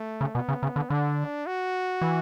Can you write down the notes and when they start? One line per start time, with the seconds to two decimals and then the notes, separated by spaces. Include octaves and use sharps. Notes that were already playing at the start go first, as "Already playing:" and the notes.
Already playing: A3
0.21 C#3
0.35 B2 B3
0.49 C#3
0.63 C#3
0.76 D3
0.90 D3 D4
1.47 F#4
2.01 E3